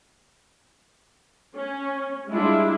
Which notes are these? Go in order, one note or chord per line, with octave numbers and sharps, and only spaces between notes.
C#4
G3 G#3 D4 E4 F4